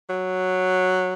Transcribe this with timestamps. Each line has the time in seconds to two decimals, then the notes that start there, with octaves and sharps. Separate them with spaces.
0.09 F#3